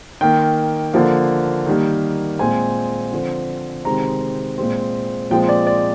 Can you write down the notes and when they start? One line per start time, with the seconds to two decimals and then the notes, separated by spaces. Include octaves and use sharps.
0.21 D#3 A#3 G5
0.94 D3 F3 A#3
1.67 D#3 G3 A#3
2.39 A#2 G#3 C4 G#5
3.12 D3 F3 C4
3.85 C3 D#3 G#3 C4 A#5
4.58 A#2 G#3 C4
5.30 A#2 F3 G#3 C4 G5
5.49 D5
5.67 D5